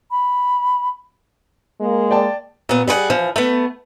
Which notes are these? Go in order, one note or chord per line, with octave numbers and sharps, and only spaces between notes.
B5
G#3 A#3
D5 G5 A5
A#2 B3
G3 G#4 C5 F#5
E3 F3
A3 B3